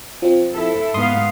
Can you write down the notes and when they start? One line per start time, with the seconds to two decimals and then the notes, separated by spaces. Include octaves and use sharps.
0.22 F3 C4
0.54 E4 A4
0.94 G#2 B3 F5 C6 D#6